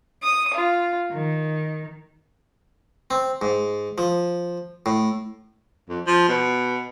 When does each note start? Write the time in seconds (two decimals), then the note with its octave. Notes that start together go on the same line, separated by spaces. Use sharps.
0.22 D#6
0.53 F4
1.12 D#3
3.10 C4
3.42 G#2
3.98 F3
4.86 A2
5.89 F2
6.07 F3
6.28 B2